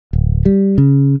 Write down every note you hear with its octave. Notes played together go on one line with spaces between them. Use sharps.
D1
G3
C#3